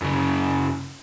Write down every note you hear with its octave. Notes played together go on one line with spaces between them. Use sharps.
F#2 C#3